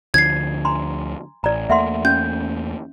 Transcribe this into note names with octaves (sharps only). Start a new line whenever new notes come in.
D2 D3 F3 G#6 C7
G#5 A#5 C6
A1 D5 A#5
E2 A3 A#3 E5 F#5 C6
C#4 G6